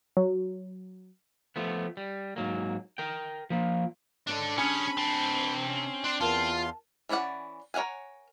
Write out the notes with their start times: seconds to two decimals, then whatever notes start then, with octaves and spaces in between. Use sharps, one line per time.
0.17 F#3
1.56 F3 A3 B3
1.97 G3
2.36 G#2 F#3 A#3
2.98 A#4 G5
3.50 F3 A#3
4.27 G#2 D4 A4 C#5 D#5
4.58 C#3 G3 C#4 D4 G#4 C#5 G#5 B5
4.98 C3 C4 A5
5.67 C#4
6.04 D4 C6
6.20 E2 F4 A#4 F5 A5 C6
7.09 E3 C#4 C#5 D5 F#5
7.74 A#4 C#5 F5 F#5 G#5